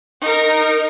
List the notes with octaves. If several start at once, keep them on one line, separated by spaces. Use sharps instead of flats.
D#4 A#4